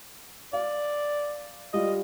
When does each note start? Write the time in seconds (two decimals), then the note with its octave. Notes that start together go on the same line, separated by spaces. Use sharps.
0.53 D5 F5
1.74 G3 F4 D#5